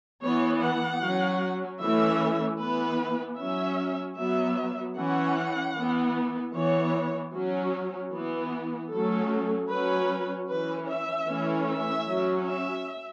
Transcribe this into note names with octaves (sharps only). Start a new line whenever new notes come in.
E3 B3 C#5
F#5
F#3 C#4
E3 A3 C#4 E5
E3 B3 B4
F#3 C#4 E5
F#3 B3 E5
E3 C#4 F#5
E3
B3
E3 B3 C#5
F#3 C#4
E3 B3
F#3 A3 C#4 A4
F#3 C#4 B4
E3 C#4 B4
E5
E3 A3 C#4
E5
F#3 C#4
E5